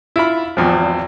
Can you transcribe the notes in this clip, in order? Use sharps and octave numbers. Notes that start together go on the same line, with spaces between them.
E4 F4 B5
G#1 E2 F3